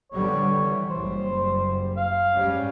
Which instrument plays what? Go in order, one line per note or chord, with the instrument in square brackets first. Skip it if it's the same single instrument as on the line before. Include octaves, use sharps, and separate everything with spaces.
[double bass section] D3 G3 B3 [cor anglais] C#5
[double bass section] E3
[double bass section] F#1 G3 [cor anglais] C5
[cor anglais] F5
[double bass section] G#2 G3 C#4